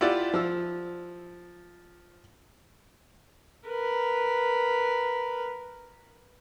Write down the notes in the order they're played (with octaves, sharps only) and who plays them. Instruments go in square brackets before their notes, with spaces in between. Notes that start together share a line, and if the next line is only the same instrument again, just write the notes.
[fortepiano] E4 F4 G4 D5 F#5
F3 E6
[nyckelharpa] A#4 B4